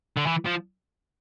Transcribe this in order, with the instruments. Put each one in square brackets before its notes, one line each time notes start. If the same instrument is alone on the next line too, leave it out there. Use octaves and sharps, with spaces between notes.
[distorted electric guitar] D3
E3
F3